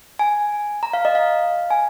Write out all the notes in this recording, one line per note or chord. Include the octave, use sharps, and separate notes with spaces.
G#5
A#5
F5
D#5
F5
G#5